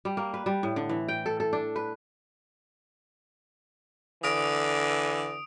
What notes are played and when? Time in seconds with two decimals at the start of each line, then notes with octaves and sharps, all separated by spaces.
0.05 G3
0.17 A#3
0.34 B4
0.46 G3
0.63 A2
0.76 D3
0.89 E3
1.08 G5
1.26 A4
1.40 A4
1.53 D4
1.76 B4
4.24 D3 E3 D#6 D7